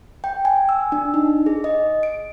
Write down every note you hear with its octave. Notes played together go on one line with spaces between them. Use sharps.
G5
G#5
E6
D4
D#4
G#4
D#5
D7